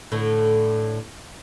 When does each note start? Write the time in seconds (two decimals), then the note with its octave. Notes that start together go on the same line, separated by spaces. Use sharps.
0.12 A2 D3